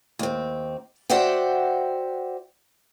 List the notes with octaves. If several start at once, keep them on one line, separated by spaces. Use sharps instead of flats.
D#2 C4
F#4 C5 D5 E5 F#5 G5